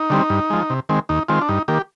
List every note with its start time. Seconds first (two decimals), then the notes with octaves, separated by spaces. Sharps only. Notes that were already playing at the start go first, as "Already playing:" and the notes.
Already playing: D#4
0.10 D3 G3 C4
0.30 G2
0.50 F3 G#3
0.70 C3
0.89 D#3 G#3 C4
1.09 D#2 D#4
1.28 D#3 G#3 C4 F4
1.41 D4
1.49 G2 D#4
1.68 D#3 A#3 G4